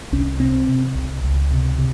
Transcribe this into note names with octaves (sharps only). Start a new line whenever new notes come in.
C2 C#4
C3 C4
C3
C2
C#2
C3
C3